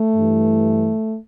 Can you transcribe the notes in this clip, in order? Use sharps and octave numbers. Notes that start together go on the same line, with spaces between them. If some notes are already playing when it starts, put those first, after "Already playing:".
Already playing: A3
G2 E3